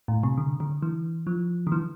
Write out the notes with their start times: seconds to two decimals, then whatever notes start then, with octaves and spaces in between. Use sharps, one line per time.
0.08 A2
0.23 C3
0.38 D3
0.60 D3
0.82 E3
1.27 F3
1.67 D3
1.72 E3